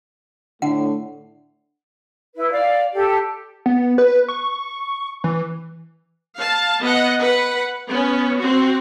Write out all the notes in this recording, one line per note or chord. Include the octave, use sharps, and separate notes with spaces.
A2 D3 F#5
E4 B4
D5 F5
G4 A4
B3
B4
C#6
E3
F5 A5
B3 D#5 F#5
B4 F#5
B3 C#4
C4 F#4